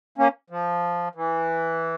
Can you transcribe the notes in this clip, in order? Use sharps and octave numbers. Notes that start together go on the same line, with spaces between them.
A#3 C#4
F3
E3